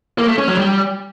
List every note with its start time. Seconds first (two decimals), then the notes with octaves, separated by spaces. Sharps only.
0.18 A#3
0.28 A3
0.38 C#4
0.48 F#3
0.58 G3